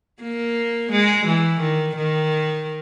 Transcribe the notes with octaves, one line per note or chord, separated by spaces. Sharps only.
A#3
G#3
E3
D#3
D#3